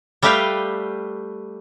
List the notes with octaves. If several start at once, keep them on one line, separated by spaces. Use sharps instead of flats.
G3 A3 G4 B4 F5 G5